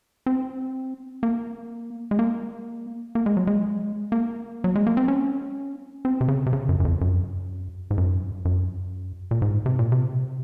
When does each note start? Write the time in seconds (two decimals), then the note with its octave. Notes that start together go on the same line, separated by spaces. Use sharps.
0.26 C4
1.23 A#3
2.11 G#3
2.19 A#3
3.15 A#3
3.26 G#3
3.37 F#3
3.47 G#3
4.12 A#3
4.64 F#3
4.75 G#3
4.87 A#3
4.97 C4
5.08 C#4
6.05 C4
6.21 C3
6.28 C#3
6.46 C3
6.53 C#3
6.69 F#2
6.80 F#2
6.85 F2
7.01 F#2
7.91 G#2
7.98 F#2
8.45 F#2
9.31 A#2
9.42 G#2
9.66 C3
9.79 A#2
9.92 C3